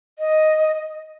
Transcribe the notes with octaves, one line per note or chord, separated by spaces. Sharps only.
D#5